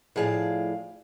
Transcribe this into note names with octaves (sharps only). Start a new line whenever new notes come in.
A2 F3 G#4 D5 F5